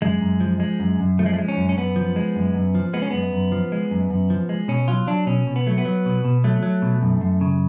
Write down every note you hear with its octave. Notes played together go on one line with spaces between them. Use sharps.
F#2 G#3
F#2
F3
G#3
F#2
F#2
F3 A3
G#3
A3
G#3
C#4
F#2
C#4
F#2 B3
F3
G#3
F#2
F#2
F3
G#3 B3
C#4
F#2 B3
F#2
F3
G#3
F#2
F#2
F3
G#3
B2 C#4
F#3 F4
F#3 D4
B2 C#4
B2
B3
F#3 A3
B3
F#3
B2
B2
F#3 A3
F#3
B2
F#2
F#2
C#3